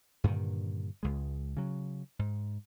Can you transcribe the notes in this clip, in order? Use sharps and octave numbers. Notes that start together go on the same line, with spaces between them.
G2 A#2 D3 D#3
C#2 G#3
C#3 F#3
G#2